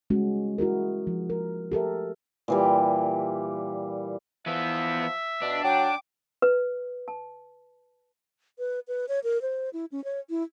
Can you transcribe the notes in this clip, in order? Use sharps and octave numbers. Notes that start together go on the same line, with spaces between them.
G3 G#3 C#4 F#4
E4 F#4 G#4 A#4
F3
A#4
G4 A4 A#4 E5
A#2 E3 G3
E3 F3 B3 E5
B2 D4
F#3 G5 D6
B4
A5
B4
B4
C#5
A#4
C5
E4
C#4
C#5
E4